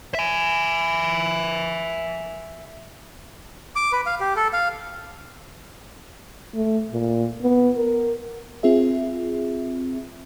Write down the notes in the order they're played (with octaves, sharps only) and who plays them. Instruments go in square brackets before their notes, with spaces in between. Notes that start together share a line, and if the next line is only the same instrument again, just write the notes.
[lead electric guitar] E5 G#5
[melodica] D6
B4
F5
G4
A4
F5
[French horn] A3
A#2
B3
A#4
[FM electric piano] C4 F4 G#4 E5